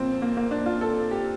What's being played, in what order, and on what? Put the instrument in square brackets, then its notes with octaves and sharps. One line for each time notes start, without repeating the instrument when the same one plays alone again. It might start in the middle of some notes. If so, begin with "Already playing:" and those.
Already playing: [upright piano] A#2 F3 A#3 C4
A#3
A#3
D4
F4
A4
G4